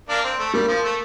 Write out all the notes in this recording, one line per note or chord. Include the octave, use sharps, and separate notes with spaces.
A#3 D4
C4
A3
G3 A#3
F3
A3